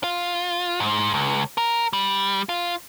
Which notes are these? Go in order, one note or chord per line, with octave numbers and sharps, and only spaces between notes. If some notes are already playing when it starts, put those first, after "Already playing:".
F4
G#2
C#2
A#4
G3
F4